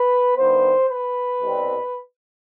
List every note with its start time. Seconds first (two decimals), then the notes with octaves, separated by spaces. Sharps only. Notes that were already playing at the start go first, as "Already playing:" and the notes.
Already playing: B4
0.37 G2 D#3 B3 C5
0.89 B4
1.41 C2 B2 G3 C4